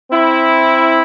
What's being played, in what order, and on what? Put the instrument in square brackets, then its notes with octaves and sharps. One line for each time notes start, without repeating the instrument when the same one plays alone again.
[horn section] C4 E4